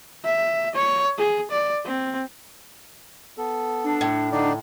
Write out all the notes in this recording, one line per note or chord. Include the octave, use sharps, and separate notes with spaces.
E5
C#5
G#4
D5
C4
B3 A4
D4
A2
D3 D4 D#4 D5